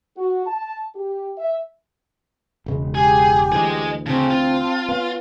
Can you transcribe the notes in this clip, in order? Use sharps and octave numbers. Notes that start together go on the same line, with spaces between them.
F#4
A5
G4
E5
E1 C#3 G#3
G4 G#4 G#5
D2 E3 G#4 D#5
C#3 C4 A5
F4
B3 C#4 F5